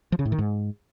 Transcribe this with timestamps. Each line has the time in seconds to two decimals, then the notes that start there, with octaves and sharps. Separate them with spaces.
0.12 F3
0.19 C#3
0.25 A2
0.32 D#3
0.39 G#2